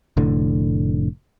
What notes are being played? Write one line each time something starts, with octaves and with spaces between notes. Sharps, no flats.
F1 A2 D3